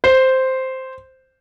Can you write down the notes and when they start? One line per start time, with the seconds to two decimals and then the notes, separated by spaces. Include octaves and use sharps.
0.04 C5